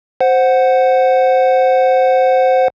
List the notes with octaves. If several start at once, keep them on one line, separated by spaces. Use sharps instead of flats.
C5 F#5